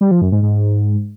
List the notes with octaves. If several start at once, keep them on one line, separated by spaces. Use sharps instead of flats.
G3
F3
F#2
G#2
G#2